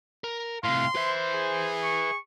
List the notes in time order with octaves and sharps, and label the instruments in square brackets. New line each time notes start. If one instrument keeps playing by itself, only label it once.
[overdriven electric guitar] A#4
[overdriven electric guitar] A2 C3 [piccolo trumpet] F5 [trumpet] C6
[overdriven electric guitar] B4 E5 [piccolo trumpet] C5
[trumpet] G#4
[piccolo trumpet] C#6